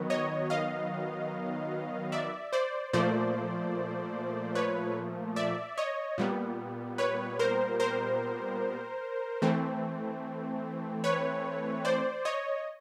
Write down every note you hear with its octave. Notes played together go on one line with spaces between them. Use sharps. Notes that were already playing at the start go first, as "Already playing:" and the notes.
Already playing: D#3 F#3 B3
C#5 D#5
D#5 F5
D5 E5
C5 D5
A#2 F3 A3 C5 D5
B4 C#5
D5 E5
C#5 D#5
A#2 G3 B3
B4 C#5
A#4 C5
A#4 C5
E3 A3 C4
B4 C#5
C5 D5
C#5 D#5